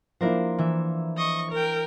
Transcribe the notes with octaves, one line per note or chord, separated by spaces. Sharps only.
F3 A#3 D4 E4 A#4 C5
E3 E5
D#5 C#6
A#4 G5